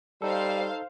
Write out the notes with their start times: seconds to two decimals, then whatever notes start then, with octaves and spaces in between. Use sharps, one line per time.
0.22 G3 D#4 A4 C5 F5